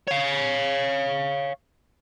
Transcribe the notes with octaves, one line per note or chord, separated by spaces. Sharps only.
C#5 F5